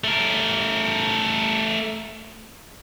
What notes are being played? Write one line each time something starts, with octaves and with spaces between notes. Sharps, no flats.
A3 A#4